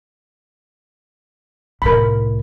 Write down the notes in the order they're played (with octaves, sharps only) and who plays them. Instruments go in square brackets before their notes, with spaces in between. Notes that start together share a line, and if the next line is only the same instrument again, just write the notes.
[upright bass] C2 A2 [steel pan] A#4 B5